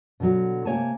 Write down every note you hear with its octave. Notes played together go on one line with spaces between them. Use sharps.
B2 D3 F3 F#3
C3 A#3 C#5 G#5 A5